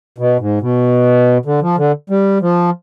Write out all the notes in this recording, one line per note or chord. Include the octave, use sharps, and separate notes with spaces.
B2
G#2
B2
D3
F3
D3
G3
F3